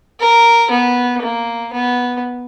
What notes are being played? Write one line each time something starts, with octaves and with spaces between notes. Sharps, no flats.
A#4
B3
A#3
B3